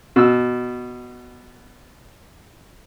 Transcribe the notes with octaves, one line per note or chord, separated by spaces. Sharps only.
B2 E6